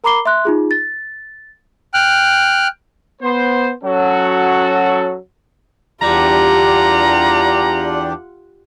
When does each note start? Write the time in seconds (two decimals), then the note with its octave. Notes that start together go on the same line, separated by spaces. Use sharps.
0.04 A#4 A#5 B5 D6 C7 G7
0.26 E5 C6 F#6
0.45 D#4 F4 G#4
0.71 A6
1.94 G5 F6 F#6
3.22 B3 C5
3.84 F#3 C#4 F#4 A4
6.01 E2 G3 D4 F4 G4 F#5 A#5